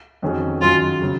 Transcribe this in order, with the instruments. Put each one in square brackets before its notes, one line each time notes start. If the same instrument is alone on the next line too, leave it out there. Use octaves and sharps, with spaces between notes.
[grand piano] F2 D#3 F#3 C#4 G#4
[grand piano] F#2 D#3 F#3 C#4 F#4 [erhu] F4
[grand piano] C#3 F#3